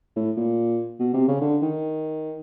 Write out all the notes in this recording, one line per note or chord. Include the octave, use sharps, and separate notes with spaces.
A2
A#2
B2
C3
C#3
D3
D#3